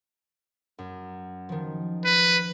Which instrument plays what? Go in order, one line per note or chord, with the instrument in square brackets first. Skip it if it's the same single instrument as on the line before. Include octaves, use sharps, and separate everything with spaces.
[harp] F#2
D#3 F3
[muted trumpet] B4